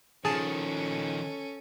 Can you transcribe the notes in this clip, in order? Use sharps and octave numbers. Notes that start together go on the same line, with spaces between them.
D#3 F3 C#4 G#4 A4 A5